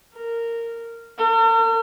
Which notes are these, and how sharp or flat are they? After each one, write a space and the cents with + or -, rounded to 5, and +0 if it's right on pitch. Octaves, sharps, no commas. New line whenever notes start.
A#4 -15
A#4 -45